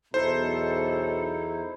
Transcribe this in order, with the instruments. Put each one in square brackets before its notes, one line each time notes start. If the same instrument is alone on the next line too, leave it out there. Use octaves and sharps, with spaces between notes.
[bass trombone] B1 [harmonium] E2 D#4 E4 [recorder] A4 [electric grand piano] C5